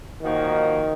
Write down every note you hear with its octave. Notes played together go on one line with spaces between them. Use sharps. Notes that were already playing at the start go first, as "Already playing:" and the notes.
A#2 D#3 F3 A#3 D#4 F#4